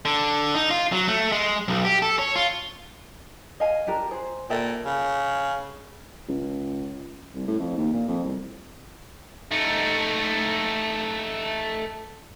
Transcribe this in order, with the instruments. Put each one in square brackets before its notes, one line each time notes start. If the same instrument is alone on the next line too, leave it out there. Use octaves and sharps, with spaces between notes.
[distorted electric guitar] D3
D#4
F4
F#3
A3
G#3
B1
G4
A4
C#5
F4
[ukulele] D#5 F5 G#5
D4 G4 A#4
G#4 C5
[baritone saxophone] A#2 [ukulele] A4 E5 G5
[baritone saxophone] C#3
[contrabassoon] C#2
C2
A2
F2
D#2
A#2
F2
C2
[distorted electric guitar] A3 D#4